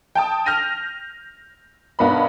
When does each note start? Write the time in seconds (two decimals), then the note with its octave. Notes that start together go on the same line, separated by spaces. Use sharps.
0.15 G5 A5 D#6
0.46 F6 G6 A#6 D#7
1.99 B1 B3 D4 A#4 D#5 B5